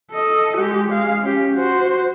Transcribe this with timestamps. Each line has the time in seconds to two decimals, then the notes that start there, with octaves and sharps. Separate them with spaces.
0.12 A4 D#5
0.57 G#3 G4
0.91 G#3 F5
1.22 C#4 G4
1.56 F#4 C5